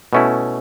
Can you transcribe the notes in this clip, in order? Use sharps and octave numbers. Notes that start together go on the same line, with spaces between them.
B2 A3 C#4 E4